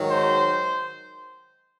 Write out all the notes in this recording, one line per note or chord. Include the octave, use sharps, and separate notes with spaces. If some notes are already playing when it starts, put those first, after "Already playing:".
Already playing: G#2 D#3 F#3
C5